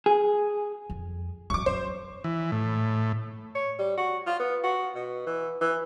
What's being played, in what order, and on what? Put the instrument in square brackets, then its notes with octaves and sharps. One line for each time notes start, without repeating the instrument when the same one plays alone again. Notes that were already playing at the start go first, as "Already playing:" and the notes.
[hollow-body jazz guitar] G#4
[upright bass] F2
[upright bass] F#2 E3 [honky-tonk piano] C#6 D6
[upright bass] F#2 [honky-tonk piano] C5
[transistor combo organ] E3
A2
[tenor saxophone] C#5
G3
F#4
F4
B3
F#4
B2
E3
E3